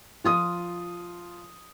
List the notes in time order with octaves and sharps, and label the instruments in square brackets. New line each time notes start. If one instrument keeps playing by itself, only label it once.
[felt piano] F3 F4 D#6